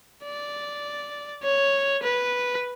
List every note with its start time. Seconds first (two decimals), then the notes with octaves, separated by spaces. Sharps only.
0.25 D5
1.43 C#5
2.03 B4